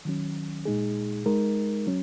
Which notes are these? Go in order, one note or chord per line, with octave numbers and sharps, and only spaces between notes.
D#3 F#3 C#4
A#2 G#3 D#4 G#4
G#3 D#4 A#4
F#3 C#4